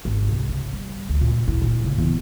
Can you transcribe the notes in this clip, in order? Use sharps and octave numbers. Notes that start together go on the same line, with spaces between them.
G#1
C2
C#3
G3
D2
A#2
E4
A#2
C#3
E2